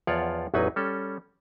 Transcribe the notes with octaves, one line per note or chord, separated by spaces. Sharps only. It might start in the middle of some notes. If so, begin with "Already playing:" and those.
E2 F3 F4 C#5 D5 F#5
A1 E2 F#3 D#4 B4 G#5
G3 C#4 A4